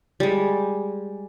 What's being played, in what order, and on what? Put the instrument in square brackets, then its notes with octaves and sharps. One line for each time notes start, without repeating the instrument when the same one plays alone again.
[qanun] G3 G#3